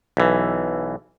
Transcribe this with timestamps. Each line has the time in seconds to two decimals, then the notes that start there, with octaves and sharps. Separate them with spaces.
0.17 B1 E3